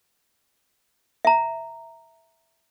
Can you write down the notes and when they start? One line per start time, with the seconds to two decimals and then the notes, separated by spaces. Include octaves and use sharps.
1.25 E5 A#5